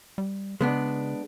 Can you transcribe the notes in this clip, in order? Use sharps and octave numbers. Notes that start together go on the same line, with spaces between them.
G3
C#3 G#3 B3 D4